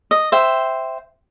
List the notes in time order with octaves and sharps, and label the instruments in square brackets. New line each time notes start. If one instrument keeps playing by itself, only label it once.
[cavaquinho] D#5
C5 E5 G5